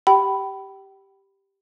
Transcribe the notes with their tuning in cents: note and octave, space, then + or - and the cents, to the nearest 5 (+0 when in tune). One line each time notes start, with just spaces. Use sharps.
G4 +0 G5 -30 B5 +0